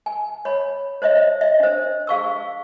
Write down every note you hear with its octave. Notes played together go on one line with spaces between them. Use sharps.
G#5
C#5 B5
C5 C#5 D#5 E5
D#5 E5
D4 C5
G#4 F5 C#6 E6